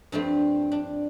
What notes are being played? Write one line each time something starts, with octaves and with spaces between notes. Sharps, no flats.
G2 F3 A3 C4 D4
D4